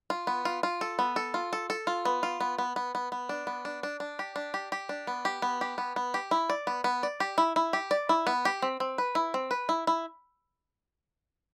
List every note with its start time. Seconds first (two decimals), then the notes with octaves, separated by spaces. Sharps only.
0.10 F4
0.27 B3
0.45 F4
0.63 F4
0.81 A4
0.99 B3
1.16 A4
1.34 F4
1.53 A4
1.70 A4
1.87 F4
2.05 B3
2.23 F4
2.40 B3
2.58 B3
2.76 B3
2.95 B3
3.12 B3
3.29 D4
3.47 B3
3.65 D4
3.83 D4
4.00 D4
4.19 G4
4.36 D4
4.54 G4
4.72 G4
4.89 D4
5.07 B3
5.25 G4
5.42 B3
5.61 G4
5.78 B3
5.96 B3
6.14 G4
6.31 E4
6.50 D5
6.67 B3
6.84 B3
7.03 D5
7.20 G4
7.38 E4
7.56 E4
7.73 G4
7.91 D5
8.09 E4
8.27 B3
8.45 G4
8.62 C4
8.80 C4
8.98 B4
9.15 E4
9.34 C4
9.51 B4
9.69 E4
9.87 E4